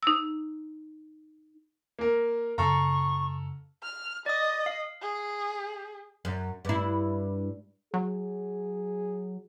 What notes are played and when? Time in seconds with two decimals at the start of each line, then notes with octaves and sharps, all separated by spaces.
0.03 D#4 E6
1.99 A#3 A#4
2.58 F#2 C#3 A4 F5 A#5 C#6
3.83 F6
4.26 D5 D#5 D#6
4.66 F5
5.01 G#4
6.25 F#2
6.65 G2 E4
7.94 F#3 G#4